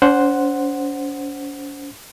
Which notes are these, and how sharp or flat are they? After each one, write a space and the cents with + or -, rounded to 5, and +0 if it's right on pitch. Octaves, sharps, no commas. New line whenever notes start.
C#4 +45 C5 +0 F#5 +0